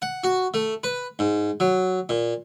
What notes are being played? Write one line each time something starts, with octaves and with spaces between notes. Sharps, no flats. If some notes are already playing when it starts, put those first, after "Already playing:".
F#5
F#4
A3
B4
G#2
F#3
A#2